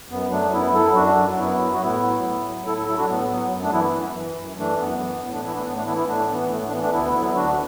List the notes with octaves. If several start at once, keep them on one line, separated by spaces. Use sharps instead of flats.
F#2 B3
F#3 A3 D4
F#2 B3 E4
F#3 E4 A4
F#2 D4 F#4
F#3
F#2 B3 E4
F#3
F#4
A2 B3 E4
F#3
A2
F#3
A2 E4 A4
E4 A4
F#3 E4 A4
D4 F#4
A2 B3
F#3 B3
F#2
A3 D4
E3 B3 E4
F#2
E3
F#2
E3 A3 D4
F#2 B3
E3
A2 B3
A3 D4
E3 B3 E4
A3 D4
A2 B3
A3 D4
E3 B3 E4
B3 E4
A2 A3 D4
E3 B3
A2 A3
A3
D4
E3 B3
A3 D4
D2 B3 E4
D3 F#3 B3 E4
D2 D4 F#4